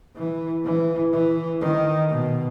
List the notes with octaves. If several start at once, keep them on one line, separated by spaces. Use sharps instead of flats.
E3
E3
E3
D#3
B2